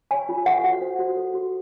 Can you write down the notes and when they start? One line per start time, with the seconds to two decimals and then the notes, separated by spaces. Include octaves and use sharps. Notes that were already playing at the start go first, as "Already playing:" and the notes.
0.11 C#5 G#5
0.29 F4
0.46 A4 F#5
0.64 F#4
0.81 C5
0.99 F#4
1.17 A4
1.34 F#4